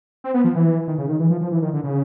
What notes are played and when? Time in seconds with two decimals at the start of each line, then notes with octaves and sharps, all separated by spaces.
0.24 C4
0.34 B3
0.44 F3
0.55 E3
0.88 D#3
0.98 C#3
1.09 D#3
1.19 E3
1.30 F3
1.41 F3
1.52 E3
1.62 D#3
1.73 D3
1.83 C#3